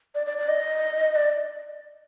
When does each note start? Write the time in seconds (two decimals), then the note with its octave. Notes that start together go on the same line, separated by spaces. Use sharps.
0.15 D5
0.26 D5
0.38 D5
0.49 D#5
1.16 D5